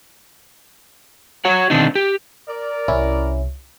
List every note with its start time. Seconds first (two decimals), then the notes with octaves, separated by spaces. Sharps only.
1.45 F#4 C#5 F#5
1.70 B2 D3 D#3 C4 D4 D#4
1.96 G4
2.48 A#4 D5
2.88 C2 C#4 E4